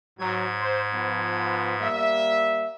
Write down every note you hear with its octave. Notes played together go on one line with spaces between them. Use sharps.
G#2 F#3 G#6
C5
F3 B3
G3 A#3 E5